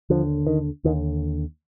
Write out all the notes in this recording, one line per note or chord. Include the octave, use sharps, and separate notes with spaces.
D#2 D3 F3
D#3
D#2 D3 D#3